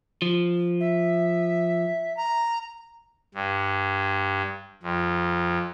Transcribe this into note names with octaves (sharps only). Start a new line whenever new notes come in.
F3
E5
A#5
G2
F2